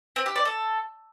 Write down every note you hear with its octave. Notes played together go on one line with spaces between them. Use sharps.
C4
G4
D5
A4